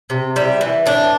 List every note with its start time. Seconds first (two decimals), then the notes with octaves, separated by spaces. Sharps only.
0.10 C3
0.36 G3 E4
0.61 E3
0.86 A2 D4